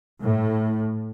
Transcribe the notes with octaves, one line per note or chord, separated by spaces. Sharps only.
A2